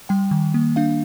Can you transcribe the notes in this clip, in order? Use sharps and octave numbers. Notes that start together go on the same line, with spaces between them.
G3 G5
D#3
A#3
D4 F5